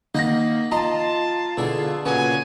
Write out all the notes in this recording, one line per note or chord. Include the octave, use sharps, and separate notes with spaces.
D#3 A#3 D#5 F#5 B5 A#6
F4 D#5 A5 A#5 C6
B2 D3 E4 G#4
A#2 C#3 B3 F#4 C#5 G#5